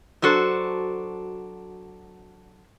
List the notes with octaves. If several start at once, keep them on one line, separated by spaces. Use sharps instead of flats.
F#3 D4 F#4 A4 C5